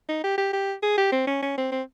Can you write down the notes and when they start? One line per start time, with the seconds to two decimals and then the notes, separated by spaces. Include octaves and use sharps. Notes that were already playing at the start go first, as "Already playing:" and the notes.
0.09 D#4
0.24 G4
0.38 G4
0.53 G4
0.82 G#4
0.97 G4
1.12 C4
1.27 C#4
1.42 C#4
1.58 C4
1.72 C4